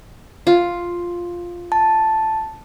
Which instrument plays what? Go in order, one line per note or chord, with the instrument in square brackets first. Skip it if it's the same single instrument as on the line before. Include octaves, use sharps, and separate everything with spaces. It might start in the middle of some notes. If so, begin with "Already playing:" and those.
[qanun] F4
[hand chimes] A5